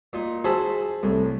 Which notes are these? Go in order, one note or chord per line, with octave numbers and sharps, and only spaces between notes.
A#2 D#4
F#4 G#4 C5 A5 B5 E6
C2 A2